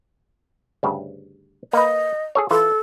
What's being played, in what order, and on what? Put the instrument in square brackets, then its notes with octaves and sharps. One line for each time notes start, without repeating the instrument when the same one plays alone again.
[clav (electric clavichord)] D2 G2 C#3
[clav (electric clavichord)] A#3 B4 [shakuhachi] D#5
[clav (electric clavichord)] G#4 A4 C#5
[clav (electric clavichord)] E3 F4 [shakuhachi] A4